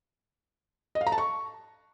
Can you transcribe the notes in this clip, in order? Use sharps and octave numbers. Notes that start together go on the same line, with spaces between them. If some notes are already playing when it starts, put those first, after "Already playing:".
D#5
F5
A#5
A5
C#6